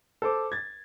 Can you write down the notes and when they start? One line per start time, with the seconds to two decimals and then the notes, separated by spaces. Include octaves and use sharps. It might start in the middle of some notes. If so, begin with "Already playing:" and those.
0.22 A4 C5 D6
0.52 G#6 A6